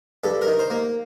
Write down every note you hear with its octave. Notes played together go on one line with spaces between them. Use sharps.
G2 A4
A#4
D#3
C5
A#3